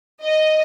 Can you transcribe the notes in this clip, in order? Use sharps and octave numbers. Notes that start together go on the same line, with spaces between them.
D#5